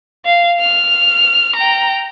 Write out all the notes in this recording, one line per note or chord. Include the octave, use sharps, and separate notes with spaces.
F5
F6
G5 A#5